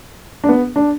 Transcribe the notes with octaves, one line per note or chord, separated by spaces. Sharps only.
D4
B3
D4